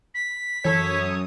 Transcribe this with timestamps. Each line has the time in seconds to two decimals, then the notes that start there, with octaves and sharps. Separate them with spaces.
0.14 B6
0.65 F#2 E3 A4 C#5 D#6